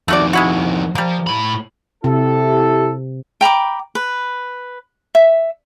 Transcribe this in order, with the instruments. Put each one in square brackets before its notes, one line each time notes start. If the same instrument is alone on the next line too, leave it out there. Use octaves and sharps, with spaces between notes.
[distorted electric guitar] F2 D#3 [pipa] A3 F#4 D5
[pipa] G#3 E4 F#4
[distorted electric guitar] F3 [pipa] G3 A#3
[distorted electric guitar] A2 B5
[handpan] C3 [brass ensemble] E4 G4 A4
[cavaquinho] G5 A#5 B5 D6
B4
E5